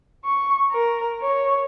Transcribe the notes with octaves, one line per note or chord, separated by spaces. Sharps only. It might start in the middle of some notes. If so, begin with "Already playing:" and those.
C#6
A#4
C#5